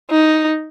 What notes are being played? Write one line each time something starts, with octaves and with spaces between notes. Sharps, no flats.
D#4